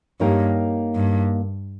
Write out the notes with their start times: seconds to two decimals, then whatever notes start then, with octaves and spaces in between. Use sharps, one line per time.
0.20 G2 A#3 D#4 G4 A#4 C#5
0.95 G2